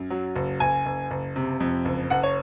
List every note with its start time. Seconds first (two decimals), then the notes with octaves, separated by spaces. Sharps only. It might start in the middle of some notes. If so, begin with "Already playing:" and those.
Already playing: F#2
0.10 F#3
0.36 F#1
0.60 F#1 G#5
0.86 F#1
1.11 F#1
1.36 C3
1.60 F2
1.85 F#1
2.10 F#1 F#5
2.23 C#5